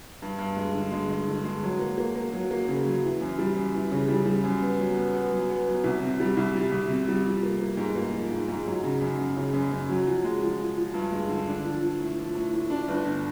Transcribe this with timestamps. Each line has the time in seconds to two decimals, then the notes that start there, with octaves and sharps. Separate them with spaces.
0.22 G2
0.39 G2
0.57 G#3
0.74 D3
0.92 G#3
1.09 G#3
1.28 D3
1.44 G#3
1.63 F#3
1.79 A#3
1.98 A#3
2.16 A#3
2.33 F#3
2.51 A#3
2.68 C#3
2.86 F#3
3.03 E3
3.21 F#2
3.39 G3
3.56 F#2
3.74 E3
3.92 C#3
4.08 G3
4.26 G3
4.44 F#2
4.61 B3
4.79 F#3
4.97 B3
5.14 B3
5.31 F#3
5.50 B3
5.67 F#3
5.84 C2
6.02 C3
6.20 G3
6.37 C2
6.55 G3
6.72 C2
6.89 C3
7.08 G3
7.25 F3
7.43 A#3
7.60 A#3
7.77 G#2
7.95 A#3
8.13 F3
8.31 G#2
8.48 G#2
8.66 F#3
8.84 C#3
9.01 F#2
9.19 F#2
9.37 C#3
9.53 F#2
9.71 F#2
9.89 F#3
10.07 F3
10.24 G#3
10.41 F3
10.59 F3
10.76 F3
10.94 G2
11.12 G#3
11.29 D3
11.47 D4
11.65 F3
11.82 F3
11.99 A2
12.18 F3
12.35 A2
12.53 A2
12.70 D4
12.88 G1
13.06 D3